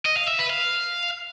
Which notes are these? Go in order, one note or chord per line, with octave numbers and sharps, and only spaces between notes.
D#5
F5
E5
B4
F5